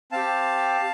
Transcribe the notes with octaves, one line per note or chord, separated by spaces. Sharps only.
C4 G4 F5 A5